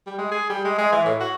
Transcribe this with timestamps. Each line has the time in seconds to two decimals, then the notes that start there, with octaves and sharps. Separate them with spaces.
0.07 G3
0.18 G#3
0.31 G#4
0.50 G3
0.65 G#3
0.78 G#3
0.92 E3
1.05 A2
1.20 F#4